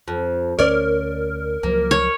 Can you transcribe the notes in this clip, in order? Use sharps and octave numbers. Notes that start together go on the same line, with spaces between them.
F2
D2 C#4 A#4 C#5 D5
C#2 F3 F#3 A#3
C#5